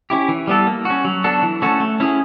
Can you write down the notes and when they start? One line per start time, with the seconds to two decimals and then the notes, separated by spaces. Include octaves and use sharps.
0.10 C#4 E4 G4
0.29 E3
0.47 G3 B3 E4 A4
0.67 A#3
0.85 C#4 F#4
1.05 F#3
1.24 B3 D4 F#4 A4
1.42 E3
1.62 A3 C#4 F#4 A4
1.80 A3
2.00 C#4 E4 G#4